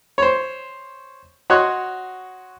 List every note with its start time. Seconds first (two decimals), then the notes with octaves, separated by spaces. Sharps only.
0.18 C5 C#5
1.50 F#4 C#5 D#5 C6 F#6